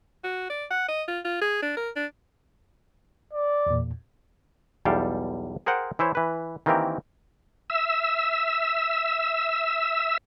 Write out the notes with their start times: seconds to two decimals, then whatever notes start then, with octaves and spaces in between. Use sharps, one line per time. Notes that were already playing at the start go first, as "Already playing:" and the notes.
0.24 F#4
0.50 D5
0.71 F#5
0.88 D#5
1.08 F4
1.25 F4
1.41 G#4
1.63 D4
1.77 A#4
1.96 D4
3.33 D5
3.66 E2 A#2
4.85 B1 E2 G3 A4 F5 G5
5.66 G#4 A#4 C5 F#5 G5
5.99 E3 E4 C5 C#5
6.15 E3 B4
6.66 D#3 E3 A#3 C4 G4 A#4
7.70 E5 E6